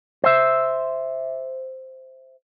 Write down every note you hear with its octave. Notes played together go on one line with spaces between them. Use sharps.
C5 E5